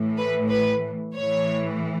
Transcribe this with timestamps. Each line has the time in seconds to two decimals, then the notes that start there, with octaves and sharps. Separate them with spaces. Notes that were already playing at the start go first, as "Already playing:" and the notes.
Already playing: A2 E3
0.17 B4
0.49 B4
1.14 A2 E3 C#5